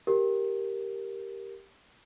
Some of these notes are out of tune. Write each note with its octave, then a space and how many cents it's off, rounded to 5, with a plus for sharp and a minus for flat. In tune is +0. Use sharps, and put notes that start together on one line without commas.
G4 +0 A#4 +0